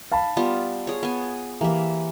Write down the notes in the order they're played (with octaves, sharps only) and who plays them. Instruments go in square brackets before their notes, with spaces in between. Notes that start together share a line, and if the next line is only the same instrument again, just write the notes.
[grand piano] F5 A5 B5
[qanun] G3 B3 F4
G#4 C#5
B3 G#5
[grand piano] E3 G4 [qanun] A#3 E5